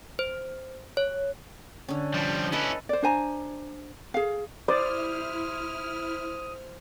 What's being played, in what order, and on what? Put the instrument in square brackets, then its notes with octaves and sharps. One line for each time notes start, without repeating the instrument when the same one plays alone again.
[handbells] C5
C#5
[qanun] D3 C#4
[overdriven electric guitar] F3 G3
[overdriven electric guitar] C#4 E4 [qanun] A4 B4 D#5
[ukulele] C5 D5
D4 C5 G#5 A#5
G#4 F5
[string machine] E4 F6 [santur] C5 [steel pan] D5 [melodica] D#6